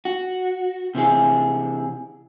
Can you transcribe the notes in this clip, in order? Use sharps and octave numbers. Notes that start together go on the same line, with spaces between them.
F#4
C3 E3 G#4